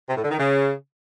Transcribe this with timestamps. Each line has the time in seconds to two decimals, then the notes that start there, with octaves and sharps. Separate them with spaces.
0.09 C3
0.16 A2
0.24 D3
0.31 D#3
0.38 C#3